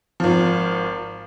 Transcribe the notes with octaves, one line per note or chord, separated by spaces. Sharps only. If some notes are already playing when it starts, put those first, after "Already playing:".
G#1 F3